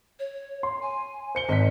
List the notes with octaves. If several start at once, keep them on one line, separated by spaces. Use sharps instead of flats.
C#5
C6
G#5
C5 C#7 G7
G#1 D#5 B6